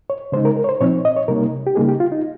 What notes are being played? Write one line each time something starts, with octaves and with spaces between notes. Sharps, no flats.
C#5
C#3 G#3 D#4 C5
A#4
A#4
C#5
C5
A#2 F3 C4 D#4 C#5
D#5
C#5
C3 G3 A#3 D#4 A#4
G4
C#3 G3 A#3 D#4 G#4
G4
F4
D#4